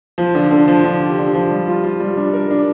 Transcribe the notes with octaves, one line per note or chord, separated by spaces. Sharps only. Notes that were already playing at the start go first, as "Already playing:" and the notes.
F3
D3
D3
F3
D3
G4
D3
F3
G3
F4
F4
G3
D4
A#4
D4